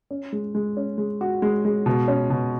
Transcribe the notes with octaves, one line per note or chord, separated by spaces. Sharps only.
C#4
G#3
G#3
C#4
G#3
F#4
G#3
G#3
B2
C#4
B2